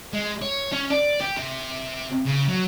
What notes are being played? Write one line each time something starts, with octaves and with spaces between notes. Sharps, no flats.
G#3
C#5
C#4
D5
G4
C3
C#3
F#3